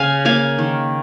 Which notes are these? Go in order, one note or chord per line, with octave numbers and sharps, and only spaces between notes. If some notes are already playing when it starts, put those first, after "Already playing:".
Already playing: C#3 F5 G#5
A#3 F5 G#5
D#3